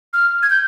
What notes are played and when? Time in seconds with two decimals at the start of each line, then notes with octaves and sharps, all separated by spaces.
0.13 F6
0.43 G#6
0.50 G6